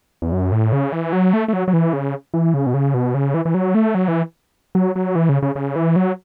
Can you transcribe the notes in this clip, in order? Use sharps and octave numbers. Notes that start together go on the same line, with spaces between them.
E2
F#2
A2
C#3
E3
F#3
A3
A3
F#3
F#3
E3
C#3
E3
C#3
B2
C#3
B2
C#3
E3
E3
F#3
A3
F#3
E3
F#3
F#3
E3
C#3
C#3
C#3
E3
F#3